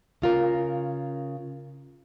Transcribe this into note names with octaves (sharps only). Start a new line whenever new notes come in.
C#3 F4 A#4